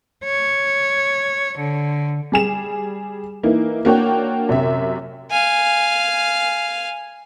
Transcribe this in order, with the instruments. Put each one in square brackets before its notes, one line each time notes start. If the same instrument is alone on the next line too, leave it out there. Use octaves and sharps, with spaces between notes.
[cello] C#5
D3
[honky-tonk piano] G3 G#4 E7
E3 A#3 D#4 E4
A#3 D4 F#4 C#5 G5
F#2 C3 E5
[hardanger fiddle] F5 G#5